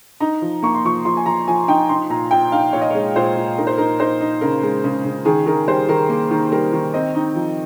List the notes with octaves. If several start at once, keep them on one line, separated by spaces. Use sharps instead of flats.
D#4 A#5
F3
A#3 C#6
C6
F3 C#6
F3 C6
G#5
F3 A#5
F3 G#5
D#4 G5
D#4 C6
A#2 A#5
A#2 G5
D#4 F5
A#2 C#5
D#5
G#3 C#5
A#2 C5
A#2
D#4 A#4
C5
D#4 A#4
D#4 C5
D#4
C#3 A#4
G#3
C#3
C#3
D#3 G#4
D#3 A#4
G3 C5
D#3 A#4
A#3
D#3
G3 A#4
D#3
C4 D#5
D#4
F3